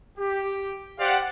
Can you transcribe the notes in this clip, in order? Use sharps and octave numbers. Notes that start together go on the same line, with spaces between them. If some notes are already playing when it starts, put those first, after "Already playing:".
G4
G4 C5 D5 F5 F#5